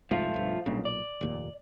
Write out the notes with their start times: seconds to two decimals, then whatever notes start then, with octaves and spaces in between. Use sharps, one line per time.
0.11 G1 C2 G#2 F3 A3 F4
0.34 B1 G2
0.66 B1 G2 A#2 C#3
0.85 D5
1.21 F1 D#2 A#2